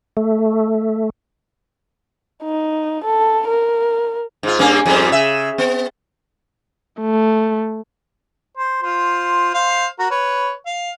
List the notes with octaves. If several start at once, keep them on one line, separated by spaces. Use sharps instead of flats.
A3
D#4
A4
A#4
G#2 F4
G2 A#3 C#4
F2 G#2 G3
C#3 E5
B3
A3
C5
F4 C5
C5 F5
F#4 A#4
B4 C#5
F5